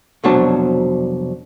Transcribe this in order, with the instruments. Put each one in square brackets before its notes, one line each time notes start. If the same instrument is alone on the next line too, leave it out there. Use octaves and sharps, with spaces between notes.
[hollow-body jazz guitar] C2 F2 B2 F#3 D4 A5